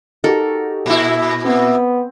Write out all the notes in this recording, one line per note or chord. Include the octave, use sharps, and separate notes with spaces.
D#4 F#4 G4 A4 A#4
A#2 E4
B3 C4